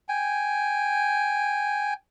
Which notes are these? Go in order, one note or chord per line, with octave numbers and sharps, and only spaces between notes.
G5 G#5